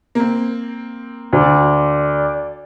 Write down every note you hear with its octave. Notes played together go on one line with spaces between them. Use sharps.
A#3 C4
D2 D5